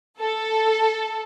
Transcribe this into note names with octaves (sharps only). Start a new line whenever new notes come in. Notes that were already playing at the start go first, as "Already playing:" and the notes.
A4